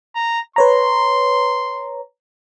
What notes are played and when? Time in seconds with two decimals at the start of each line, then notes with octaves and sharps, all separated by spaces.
0.15 A#5
0.56 B4 C#5 A#5 C6